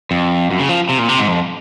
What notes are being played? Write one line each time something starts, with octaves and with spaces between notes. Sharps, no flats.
F2
F#2
C#3
F3
C3
A#2
C3
G#2
F2